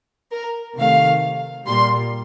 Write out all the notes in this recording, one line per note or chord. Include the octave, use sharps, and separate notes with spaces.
A#4
C3 D#3 A3 F5
A#2 G3 A#3 C6